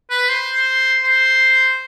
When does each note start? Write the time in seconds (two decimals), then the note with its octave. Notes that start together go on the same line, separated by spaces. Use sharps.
0.10 B4
0.29 C5
1.04 C5